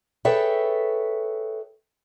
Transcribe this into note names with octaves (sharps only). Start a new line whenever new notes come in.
G#4 A4 B4 C#5 E5 G5